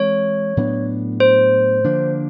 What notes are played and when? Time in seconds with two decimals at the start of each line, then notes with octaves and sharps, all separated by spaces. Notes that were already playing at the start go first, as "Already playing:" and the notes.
Already playing: E3 G#3 C4 C#5
0.57 A2 F#3 B3 D4
1.20 C5
1.84 D3 F3 A#3 D4